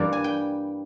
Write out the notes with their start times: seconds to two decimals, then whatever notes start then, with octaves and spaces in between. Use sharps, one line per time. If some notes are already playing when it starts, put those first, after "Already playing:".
Already playing: G2 E3 G3 A#3 D5
0.13 G#5
0.24 G5